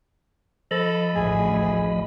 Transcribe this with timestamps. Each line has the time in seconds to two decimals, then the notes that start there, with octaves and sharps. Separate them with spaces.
0.71 F3 A4 D#5 B5
1.15 A1 D2 G#4